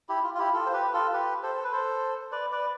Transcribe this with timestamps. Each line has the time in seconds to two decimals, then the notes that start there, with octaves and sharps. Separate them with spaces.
0.09 E4 G4
0.24 F4
0.34 F4
0.39 E4 G4
0.54 F4 A4
0.66 C5
0.73 G4 B4
0.87 B4
0.93 F4 A4
1.13 G4 B4
1.43 A4 C5
1.55 A4
1.64 B4
1.72 A4 C5
2.32 B4 D5
2.52 B4 D5